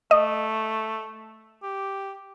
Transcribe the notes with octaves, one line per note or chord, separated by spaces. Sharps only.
A3 D#5
G4